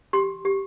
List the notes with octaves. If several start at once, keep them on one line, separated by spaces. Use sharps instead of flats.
G4 C6
G4